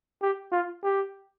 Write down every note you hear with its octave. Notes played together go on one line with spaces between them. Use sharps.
G4
F4
G4